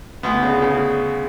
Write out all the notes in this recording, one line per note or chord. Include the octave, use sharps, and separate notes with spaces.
D2 B3
C#3
C#3